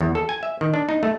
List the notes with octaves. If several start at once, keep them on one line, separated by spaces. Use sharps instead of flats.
E2
A4
G#5
E5
D#3
D4
D#4
A3